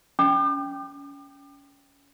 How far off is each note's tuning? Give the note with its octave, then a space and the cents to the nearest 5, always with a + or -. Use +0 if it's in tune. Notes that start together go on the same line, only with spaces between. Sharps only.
C#4 +25 D6 +40